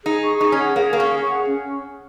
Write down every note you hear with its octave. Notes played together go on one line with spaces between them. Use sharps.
D#4 G#4
C#6
D#4 G#4
C#4
F#5
A#3 G#4
A#3 C#6
C#4
G#4
F#5
C#4